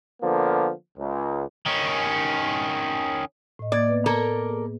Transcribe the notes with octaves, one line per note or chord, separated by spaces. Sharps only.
D3 F3 A#3 B3
C#2
D#3 C#4
A2 D#5
A#3 D5 G#6 A6
B3 B4
A#3 A4 A#4
G#4